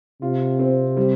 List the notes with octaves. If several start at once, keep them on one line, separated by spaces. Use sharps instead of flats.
C3 F4
C4
G3